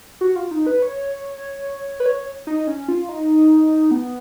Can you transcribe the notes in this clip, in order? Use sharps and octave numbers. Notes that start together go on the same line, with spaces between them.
F#4
F4
D#4
B4
C#5
B4
C#5
D#4
C#4
F4
D#4
B3